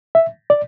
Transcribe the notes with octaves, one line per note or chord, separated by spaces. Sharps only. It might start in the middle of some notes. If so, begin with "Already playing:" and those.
E5
D5